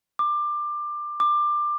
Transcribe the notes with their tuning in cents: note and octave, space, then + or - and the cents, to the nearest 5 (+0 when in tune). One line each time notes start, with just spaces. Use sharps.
D6 +20
D6 +20